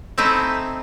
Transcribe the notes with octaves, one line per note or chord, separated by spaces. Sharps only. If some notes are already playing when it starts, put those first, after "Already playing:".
A3 C4 D#4 E4